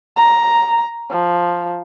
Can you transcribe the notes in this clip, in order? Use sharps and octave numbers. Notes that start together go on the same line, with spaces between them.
A#5
F3